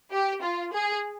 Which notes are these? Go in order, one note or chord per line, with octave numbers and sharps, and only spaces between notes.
G4
F4
G#4